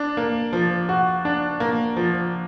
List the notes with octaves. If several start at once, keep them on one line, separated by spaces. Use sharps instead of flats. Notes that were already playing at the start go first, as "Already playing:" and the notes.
Already playing: D4
A#3
F3
F#4
D4
A#3
F3